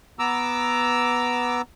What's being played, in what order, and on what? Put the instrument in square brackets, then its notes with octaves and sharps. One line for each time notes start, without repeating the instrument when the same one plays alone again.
[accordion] B3 A#5 D6 E6